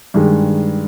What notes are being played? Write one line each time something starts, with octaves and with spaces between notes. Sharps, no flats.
G2 D#3 G#3